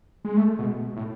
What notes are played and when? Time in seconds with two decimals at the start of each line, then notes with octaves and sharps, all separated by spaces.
0.25 G#3
0.37 A3
0.59 B2
0.97 A2